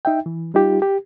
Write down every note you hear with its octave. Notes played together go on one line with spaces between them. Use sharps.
D#4 E5 G5
E3
G3 D#4 F4 G4
G4